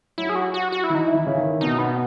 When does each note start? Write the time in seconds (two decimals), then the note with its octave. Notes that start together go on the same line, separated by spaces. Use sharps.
0.18 F#3 E4
0.29 G#4
0.35 F#4
0.54 F#4
0.72 F#4
0.84 E4
0.90 E3 D#4
1.07 E4
1.14 E3
1.27 C#3
1.37 D#3
1.61 B2 D#4
1.79 B2 B3